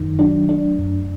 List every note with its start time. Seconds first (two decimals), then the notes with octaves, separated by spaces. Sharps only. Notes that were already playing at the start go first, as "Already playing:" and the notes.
Already playing: F#2 D#3
0.19 F#3 D4
0.49 A3 D4
0.79 F#2